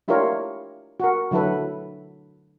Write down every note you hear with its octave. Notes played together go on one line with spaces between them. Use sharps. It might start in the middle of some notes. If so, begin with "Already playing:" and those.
D4 E4 F4 G4 A#4 C#5
F#4 A#4
D3 F#3 E4 A4 B4